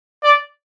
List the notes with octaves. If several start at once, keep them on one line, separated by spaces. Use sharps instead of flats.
D5